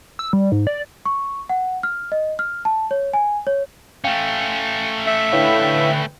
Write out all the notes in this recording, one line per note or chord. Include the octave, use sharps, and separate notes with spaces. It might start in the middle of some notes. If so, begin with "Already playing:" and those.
E6
G3
G#2
D5
C#6
F#5
F6
D#5
F6
A5
C#5
G#5
C#5
A3 C#4 F5 G5
E5
D3 E4 B4 C#5 F5 G5